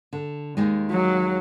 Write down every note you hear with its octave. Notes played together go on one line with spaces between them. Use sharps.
D3
D#2 D#3 G#3
F#3